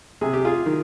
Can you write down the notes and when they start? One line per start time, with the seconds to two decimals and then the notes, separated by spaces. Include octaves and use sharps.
0.21 C3 G#4
0.33 G4
0.45 F4 G#4
0.66 D#3